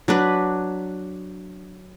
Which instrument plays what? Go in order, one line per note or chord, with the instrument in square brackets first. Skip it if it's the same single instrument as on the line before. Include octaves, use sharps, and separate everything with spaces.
[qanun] F#3 D4 B4